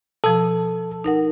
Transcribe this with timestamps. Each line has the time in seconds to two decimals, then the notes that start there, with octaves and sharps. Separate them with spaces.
0.24 B2 F3 A4
1.04 D#4 A#4 F#5